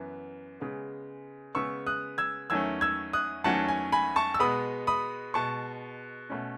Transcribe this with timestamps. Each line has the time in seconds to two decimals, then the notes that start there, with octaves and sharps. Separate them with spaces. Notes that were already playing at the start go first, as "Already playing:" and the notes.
Already playing: F#2 E3 B3
0.60 C#3 G#3 B3
1.55 C#3 G#3 B3 C#6 E6
1.87 D#6 F#6
2.18 E6 G#6
2.50 E2 D#3 F#3 A3 C#4 E6 G#6
2.81 E6 G#6
3.13 D#6 F#6
3.44 E2 D#3 F#3 A3 C#4 F#5 A5
3.68 G#5
3.92 G#5 B5
4.16 A5 C#6
4.34 E6
4.39 B2 G#3 B3 B5 D#6
4.87 B5 D#6
5.34 B2 G#3 B3 A5 C#6
6.30 B2 A3 C#4